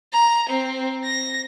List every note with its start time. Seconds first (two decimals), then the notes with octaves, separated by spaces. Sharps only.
0.13 A#5
0.49 C4
1.05 A#6